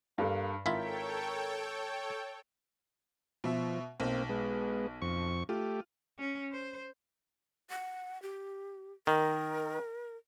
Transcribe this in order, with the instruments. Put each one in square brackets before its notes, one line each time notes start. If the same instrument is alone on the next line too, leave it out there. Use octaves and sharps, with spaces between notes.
[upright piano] G2 A4 [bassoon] A#3
[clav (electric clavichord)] G#1 E4 F4 [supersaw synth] A4 C#5 G5 [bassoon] A#4 [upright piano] B6
[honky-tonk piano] B2 E5 [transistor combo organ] F3
[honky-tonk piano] B1 [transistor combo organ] A#3 C4
[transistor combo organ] G#3 B3
F2 C#6
[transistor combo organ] A3 G4 [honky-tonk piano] F4
[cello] C#4
C5
[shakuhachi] F#5
G4
[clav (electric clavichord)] D#3 [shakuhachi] A#4